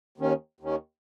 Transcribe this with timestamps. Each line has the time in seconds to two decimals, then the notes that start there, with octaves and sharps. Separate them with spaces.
0.18 D#2 D#3 C#4
0.61 D#2 D#3 C#4